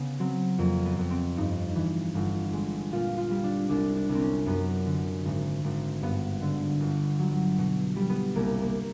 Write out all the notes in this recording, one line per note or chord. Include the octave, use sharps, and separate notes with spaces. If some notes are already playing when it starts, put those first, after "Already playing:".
Already playing: C#3 B3
F#3 C4
F2 A#3
B3
F2
C4
G2 D#4
E3
G1
G#3
A#2 F4
F4
G3
D4
C2 D4
D4
C2
C4
C#4
F#2 B3
D3
G#1
G#1
G2 B3
D3
G1
F#3
B2
G3
B3
C2 A#3
A#3